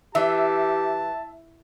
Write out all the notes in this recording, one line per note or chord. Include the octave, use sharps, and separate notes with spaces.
E3 G4 E5 A5